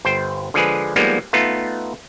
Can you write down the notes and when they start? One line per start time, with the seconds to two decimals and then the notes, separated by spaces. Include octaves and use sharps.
0.05 G1 C5 G5
0.54 D3 F3 G#3 G#4 B4
0.96 F3 G3 G#3 A#3 B3 D#4
1.33 A3 B3 D#4 F4